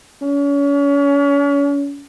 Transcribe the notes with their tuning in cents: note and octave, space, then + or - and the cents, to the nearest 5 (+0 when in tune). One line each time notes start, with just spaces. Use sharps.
C#4 +35